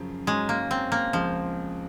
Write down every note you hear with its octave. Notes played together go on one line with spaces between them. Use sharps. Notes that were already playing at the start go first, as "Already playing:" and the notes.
Already playing: F#2 C#3 F3
G#2 F#3 G#3 C#4
A#3
C4
A#3
C#2 C#3 F3 G#3